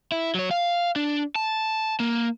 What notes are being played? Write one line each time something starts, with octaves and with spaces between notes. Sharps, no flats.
E4
F#3 C#5
F5
D4
A5
A#3